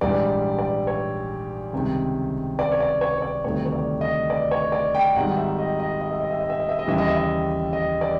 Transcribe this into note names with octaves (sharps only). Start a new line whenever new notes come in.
A#1 G#2 E3 G3 D5
D5
C#5
C#2 C3 D#3 G3
D5
C#5
D5
C#5
C#5
D5
D2 C3 D#3 G3 C#5
C#5
D5
D#5
D5
C#5
D5
G5
G#1 G#2 D#3 G3 F#5
E5
D#5
D#5
D#5
E5
D#5
E5
D#5
E5
D#5
E5
D#5
D#2 C#3 E3 G3 E5
D#5
E5
D#5
D#5
D5